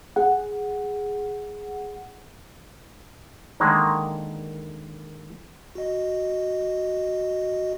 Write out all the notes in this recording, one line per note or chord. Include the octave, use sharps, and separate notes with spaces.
G#4 F#5
D3 D#3 G#3 A#3
F#4 D#5